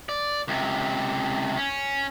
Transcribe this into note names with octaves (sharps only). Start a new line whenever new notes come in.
D5
C#2 C3
C#4